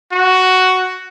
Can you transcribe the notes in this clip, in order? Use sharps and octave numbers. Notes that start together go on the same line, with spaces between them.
F#4